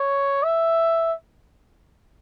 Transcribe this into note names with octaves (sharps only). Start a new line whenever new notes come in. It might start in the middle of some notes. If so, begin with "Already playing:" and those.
Already playing: C#5
E5